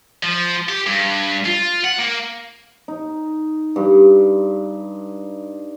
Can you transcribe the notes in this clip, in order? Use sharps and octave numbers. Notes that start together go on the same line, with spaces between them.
F3
G4
G2
F4
F#5
A#3
D#4
G2